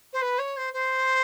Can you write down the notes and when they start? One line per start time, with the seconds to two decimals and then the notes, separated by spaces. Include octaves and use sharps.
0.12 C5
0.21 B4
0.38 C#5
0.56 C5
0.73 C5